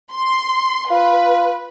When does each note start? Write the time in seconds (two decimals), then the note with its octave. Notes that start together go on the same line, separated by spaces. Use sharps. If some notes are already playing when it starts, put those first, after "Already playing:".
0.12 C6
0.90 F4 B4